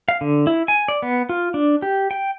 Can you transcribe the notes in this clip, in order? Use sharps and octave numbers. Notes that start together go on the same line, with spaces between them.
F5
D3
E4
G#5
D5
B3
F4
D4
G4
G5